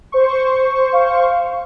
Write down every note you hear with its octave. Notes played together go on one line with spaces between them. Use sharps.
C5 C#6
F5